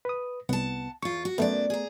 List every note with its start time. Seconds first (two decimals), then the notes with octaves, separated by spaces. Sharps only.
0.05 B4 D#6
0.49 C2 B3 F#5 A5
1.02 E2 F4 C#6
1.25 F#4
1.38 F#2 F#3 A3 B3 D5
1.70 G#4 A#5